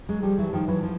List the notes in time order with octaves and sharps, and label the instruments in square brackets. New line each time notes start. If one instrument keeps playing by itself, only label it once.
[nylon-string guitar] F#3 G#3
F3 G3
E3 F#3
D#3 F3
E3 F#3
F3